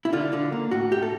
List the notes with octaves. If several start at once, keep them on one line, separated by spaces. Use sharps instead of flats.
E4
D3 F4
D3
A#3
A2 F#4
A2 G4
A4